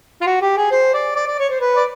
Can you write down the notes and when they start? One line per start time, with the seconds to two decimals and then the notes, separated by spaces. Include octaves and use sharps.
0.21 F4
0.26 F#4
0.41 G4
0.57 G#4
0.71 C5
0.94 D5
1.16 D5
1.27 D5
1.39 C#5
1.50 C5
1.60 B4
1.76 D5